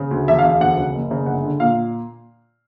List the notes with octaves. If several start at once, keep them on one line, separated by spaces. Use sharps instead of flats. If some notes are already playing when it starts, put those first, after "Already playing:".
Already playing: C#3
D2
E1 E5
F5
E1
F5
D2 F#5
C#3
F#1
C#3
G1 F#5
D3
A#2 F5